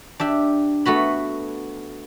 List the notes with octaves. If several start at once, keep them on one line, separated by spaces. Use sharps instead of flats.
D4 G4 E5
A3 B3 F#4 B5